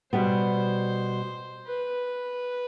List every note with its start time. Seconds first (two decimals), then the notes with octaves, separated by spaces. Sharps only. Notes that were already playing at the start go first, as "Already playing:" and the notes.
0.13 B2 G3 B3 C5
1.66 B4